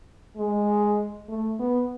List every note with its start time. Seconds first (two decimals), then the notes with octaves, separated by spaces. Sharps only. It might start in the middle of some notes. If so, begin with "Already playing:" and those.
0.37 G#3
1.28 A3
1.60 B3